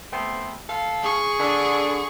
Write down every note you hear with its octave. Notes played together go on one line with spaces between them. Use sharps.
A3 B3 C4
A4 F5
G#4 C#6
D3